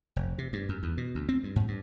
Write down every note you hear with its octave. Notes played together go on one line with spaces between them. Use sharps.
F1
C3
G2
F#2
E2
B2
D2
C4
G2
G#2
G2